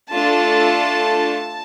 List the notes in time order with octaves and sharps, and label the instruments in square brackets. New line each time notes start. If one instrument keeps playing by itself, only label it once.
[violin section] A3 D4 F4 A4 A5